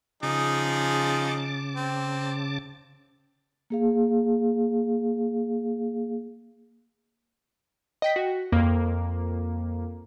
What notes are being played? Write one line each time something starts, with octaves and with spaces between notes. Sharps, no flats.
C#3 F3 D#4 G#4 A5 D6
C4
A#3 G#4 F5
D#5 G5 B6
F#4
F2 A#3